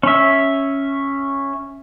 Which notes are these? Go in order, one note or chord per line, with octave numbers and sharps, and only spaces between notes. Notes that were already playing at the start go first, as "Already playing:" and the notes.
C#4 E5